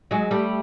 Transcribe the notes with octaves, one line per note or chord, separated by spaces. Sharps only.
F#3 G#3
G3 A3